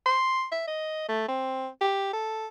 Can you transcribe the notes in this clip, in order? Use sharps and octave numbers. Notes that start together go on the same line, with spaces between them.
C6
E5
D#5
A3
C4
G4
A4